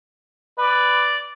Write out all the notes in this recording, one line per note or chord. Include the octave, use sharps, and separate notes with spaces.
B4 D5